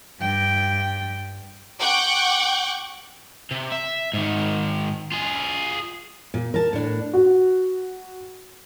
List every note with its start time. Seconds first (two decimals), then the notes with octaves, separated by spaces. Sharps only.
0.20 G2 G5
1.79 F#5 G5 C#6 D6 G6
3.51 C3
3.72 E5
4.13 G#2 D#3
5.12 F4 G#4
6.34 A#2
6.54 A#4 A5
6.73 A2 D4
7.14 F#4